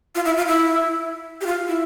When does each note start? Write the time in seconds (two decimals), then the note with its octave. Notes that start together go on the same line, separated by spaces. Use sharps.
0.15 F4
0.25 E4
0.37 F4
0.48 E4
1.41 G4
1.46 F4
1.68 E4